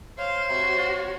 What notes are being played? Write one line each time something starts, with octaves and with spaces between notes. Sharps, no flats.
C5 C#5 F5
C3 F#4